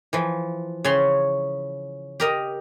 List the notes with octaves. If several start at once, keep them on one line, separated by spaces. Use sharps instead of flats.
E3 F3
C#3 C#4 C6
G4 A#4 D#5